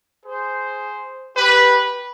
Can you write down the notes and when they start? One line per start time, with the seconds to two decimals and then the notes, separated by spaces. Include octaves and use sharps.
0.25 G#4 C5
1.35 G4 B4